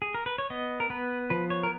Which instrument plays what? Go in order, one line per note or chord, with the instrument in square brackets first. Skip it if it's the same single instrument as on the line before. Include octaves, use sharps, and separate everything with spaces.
[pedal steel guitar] G#4
A#4
B4
C#5
B3 D#5
A#4
B3 B4
F3 B4
C#5
A#4